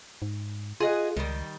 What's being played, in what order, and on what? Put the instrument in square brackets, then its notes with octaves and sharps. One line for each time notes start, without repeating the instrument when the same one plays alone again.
[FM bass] G#2
[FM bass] F4 [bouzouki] G#4 D#5 F#5
[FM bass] C#2 [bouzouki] D#3 G3